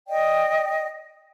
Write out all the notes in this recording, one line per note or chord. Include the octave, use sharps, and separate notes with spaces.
D5 D#5 G5